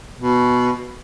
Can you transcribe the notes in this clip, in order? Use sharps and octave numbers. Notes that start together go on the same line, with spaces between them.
B2